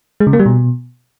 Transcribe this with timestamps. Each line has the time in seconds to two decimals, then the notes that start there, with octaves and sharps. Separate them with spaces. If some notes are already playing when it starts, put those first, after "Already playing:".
0.20 G#3
0.27 C#3
0.33 A#3
0.40 G3
0.46 B2